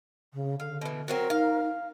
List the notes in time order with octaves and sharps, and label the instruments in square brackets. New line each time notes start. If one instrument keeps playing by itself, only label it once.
[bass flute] C#3
[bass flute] D3 [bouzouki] F5
[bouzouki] B2 E3
[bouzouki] F#3 C4 F#4 [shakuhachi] A#4
[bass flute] D#4 [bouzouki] F5